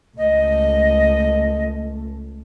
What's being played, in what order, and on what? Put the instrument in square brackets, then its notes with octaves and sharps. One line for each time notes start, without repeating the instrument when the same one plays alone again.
[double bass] C#2 A3 [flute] D#5